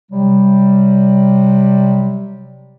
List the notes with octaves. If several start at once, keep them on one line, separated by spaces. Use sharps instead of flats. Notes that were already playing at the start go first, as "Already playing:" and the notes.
C3 F#3 G3